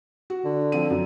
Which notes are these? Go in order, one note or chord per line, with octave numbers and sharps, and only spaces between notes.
F#4
D3
F3 C4 D#7
F#2